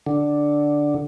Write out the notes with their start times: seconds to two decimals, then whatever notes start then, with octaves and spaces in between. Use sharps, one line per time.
0.06 D3